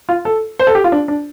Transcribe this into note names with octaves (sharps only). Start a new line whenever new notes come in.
F4
A4
C5
A4
G4
F4
D4
D4